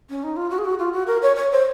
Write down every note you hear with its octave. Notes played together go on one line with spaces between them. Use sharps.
C#4
D#4
F4
F#4
G#4
F#4
F4
F#4
A#4
C#5
C#5
C5